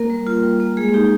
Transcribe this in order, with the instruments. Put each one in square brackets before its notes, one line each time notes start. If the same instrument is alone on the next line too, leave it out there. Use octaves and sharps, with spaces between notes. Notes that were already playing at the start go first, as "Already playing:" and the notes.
Already playing: [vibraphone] A#3 A#4
G3
F4
G3
A#3
G#3 G#4
D#4 G4